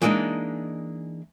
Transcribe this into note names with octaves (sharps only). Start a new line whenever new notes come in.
E3 G#3 A#3 D4 D#4